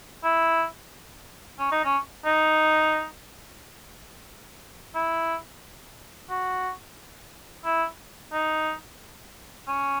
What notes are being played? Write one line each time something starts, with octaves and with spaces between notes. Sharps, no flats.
E4
C#4
D#4
C#4
D#4
E4
F#4
E4
D#4
C#4